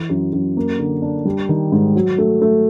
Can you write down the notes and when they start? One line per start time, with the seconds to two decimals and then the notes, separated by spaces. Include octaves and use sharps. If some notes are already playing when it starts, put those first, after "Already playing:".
Already playing: E3
0.10 F#2
0.33 F#2
0.57 A#3
0.79 D3
1.02 D4
1.25 G3
1.49 D#3
1.72 G#2
1.96 F#3
2.18 A3
2.42 A3